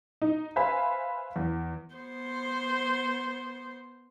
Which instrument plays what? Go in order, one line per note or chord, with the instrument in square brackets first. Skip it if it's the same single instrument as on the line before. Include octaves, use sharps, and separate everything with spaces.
[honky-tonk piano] D#4
B4 C5 E5 F5 G#5 B5
E2
[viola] B3 C5